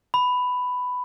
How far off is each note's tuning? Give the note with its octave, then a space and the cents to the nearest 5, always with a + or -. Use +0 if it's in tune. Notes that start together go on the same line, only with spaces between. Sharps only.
B5 +10